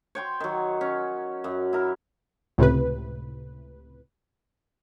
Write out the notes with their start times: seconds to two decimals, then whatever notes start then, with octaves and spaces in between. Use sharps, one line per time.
0.15 C#5 G5 C6
0.40 D#3 F#3
0.81 C#4
1.44 F#2
1.73 E4 A#4
2.58 C#2 A2 C3 B4